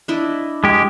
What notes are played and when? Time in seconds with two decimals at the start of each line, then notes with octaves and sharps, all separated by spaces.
0.08 D4 E4 D#5
0.64 G#3 G4